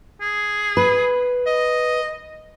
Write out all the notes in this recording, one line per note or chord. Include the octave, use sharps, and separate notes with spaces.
G#4
B4
D#5